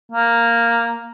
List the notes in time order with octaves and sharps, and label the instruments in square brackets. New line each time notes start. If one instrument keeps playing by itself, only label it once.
[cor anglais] A#3